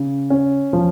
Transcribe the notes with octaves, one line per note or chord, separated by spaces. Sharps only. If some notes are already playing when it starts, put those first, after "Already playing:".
Already playing: C#3
C#4
F3